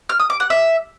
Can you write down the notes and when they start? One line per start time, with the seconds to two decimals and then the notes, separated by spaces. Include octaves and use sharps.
0.09 F6
0.20 D#6
0.30 D6
0.40 F#5
0.50 E5